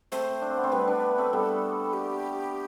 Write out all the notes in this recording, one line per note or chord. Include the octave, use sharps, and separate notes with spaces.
A3 C4 C5
D4
C4
B3
A3 C4
G3 B3 B4
B3 D4
A3 C4
G3 B3 A4
G4